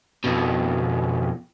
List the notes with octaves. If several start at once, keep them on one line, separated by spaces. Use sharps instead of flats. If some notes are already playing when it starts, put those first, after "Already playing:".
F2 B2